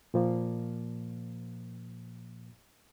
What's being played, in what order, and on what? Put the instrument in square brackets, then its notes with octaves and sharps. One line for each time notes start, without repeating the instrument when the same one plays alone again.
[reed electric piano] A#2 F3 A#3